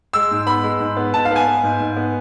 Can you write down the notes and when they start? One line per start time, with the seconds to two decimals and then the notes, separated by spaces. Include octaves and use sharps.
0.13 G#3 E6
0.31 G#2
0.47 B3 B5
0.64 G#3
0.80 G#2
0.97 B3
1.14 G#2 A5
1.25 F5
1.31 B3 G#5
1.48 B3
1.63 G#2
1.80 G#2
1.97 B3